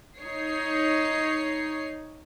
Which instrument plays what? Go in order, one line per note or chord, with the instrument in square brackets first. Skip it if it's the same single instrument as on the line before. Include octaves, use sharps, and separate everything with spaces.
[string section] D#4 C#5 C7